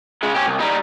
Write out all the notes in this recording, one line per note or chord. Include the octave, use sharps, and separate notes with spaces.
C#3 G#3
C#4 G4
C2
G3 D#4